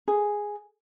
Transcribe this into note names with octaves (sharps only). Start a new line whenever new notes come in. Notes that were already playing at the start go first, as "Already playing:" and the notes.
G#4